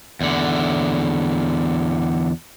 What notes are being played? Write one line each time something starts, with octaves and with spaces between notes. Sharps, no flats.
E2 D3